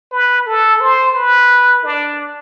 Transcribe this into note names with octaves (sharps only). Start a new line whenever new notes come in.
B4
A4
C5
B4
D4